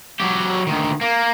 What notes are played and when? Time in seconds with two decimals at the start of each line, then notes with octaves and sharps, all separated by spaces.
0.20 F#3 G4
0.67 D2 D#3
1.01 A#3